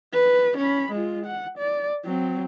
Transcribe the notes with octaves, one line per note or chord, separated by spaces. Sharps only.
B4
C#4 B5
G#3 F4
F#5
D5
F#3 C4